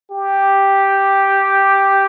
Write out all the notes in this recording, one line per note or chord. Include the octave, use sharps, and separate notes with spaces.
G4